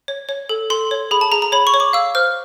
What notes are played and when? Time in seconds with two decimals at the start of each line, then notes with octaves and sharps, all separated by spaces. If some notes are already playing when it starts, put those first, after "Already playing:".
0.08 C#5
0.29 C#5
0.49 A4
0.70 A4 C6
0.91 C#5
1.11 G#4 B5
1.21 A5
1.32 G#4 A#5
1.42 A#5
1.52 C#5 B5
1.67 C#6
1.74 C#5
1.80 D6
1.93 F5 E6
2.15 C5 F6